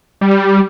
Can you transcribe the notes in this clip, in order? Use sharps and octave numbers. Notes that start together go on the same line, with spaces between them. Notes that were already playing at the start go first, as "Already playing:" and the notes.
G3